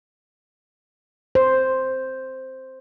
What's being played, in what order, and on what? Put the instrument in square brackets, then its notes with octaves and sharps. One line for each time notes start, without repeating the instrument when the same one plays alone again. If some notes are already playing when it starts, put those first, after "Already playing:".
[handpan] C5